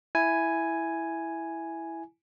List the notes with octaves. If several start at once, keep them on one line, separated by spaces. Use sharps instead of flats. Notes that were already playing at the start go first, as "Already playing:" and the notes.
E4 G#5